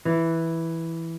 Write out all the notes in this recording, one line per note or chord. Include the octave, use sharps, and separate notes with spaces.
E3